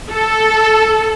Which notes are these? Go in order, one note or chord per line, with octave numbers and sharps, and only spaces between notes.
A4